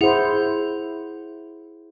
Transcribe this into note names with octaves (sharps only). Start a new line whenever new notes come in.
E4 G#4 C5 F#5